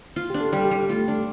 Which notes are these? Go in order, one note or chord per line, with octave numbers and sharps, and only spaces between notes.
F4
D4 G4
A4
G3
G4
G3
A3 F4
D4